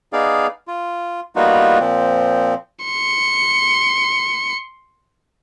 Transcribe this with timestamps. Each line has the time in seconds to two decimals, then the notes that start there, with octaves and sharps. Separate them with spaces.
0.13 B3 D#4 G#4 D5 F5
0.68 F4
1.36 G3 A#3 B3 D#4 F4 F#4
1.80 A#2 F3 C4
2.85 C6 C#7